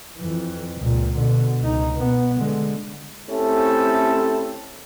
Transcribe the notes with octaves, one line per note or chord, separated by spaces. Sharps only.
F2 E3
C#2 A#2
B2 D3
C#2 D#4
B2 B3
D3 G#3
A3 C4 C#4 E4 G4 A4